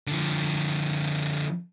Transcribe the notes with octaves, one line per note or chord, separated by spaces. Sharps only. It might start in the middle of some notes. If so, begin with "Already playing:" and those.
D3 F3